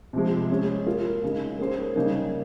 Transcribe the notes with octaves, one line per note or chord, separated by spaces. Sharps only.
C3 F3 G#3
G#3 C#4 G#4
A#3 F4 A#4
C#3 G#3 D#4
A#3 C#4 G#4 C5
C#3 G3 A#3 D#4